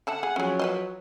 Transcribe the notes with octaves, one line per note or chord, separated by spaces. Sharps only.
D3 E5 F#5 A5
G#4
F3 F#3 C#4 G#4
B4 C5 D#5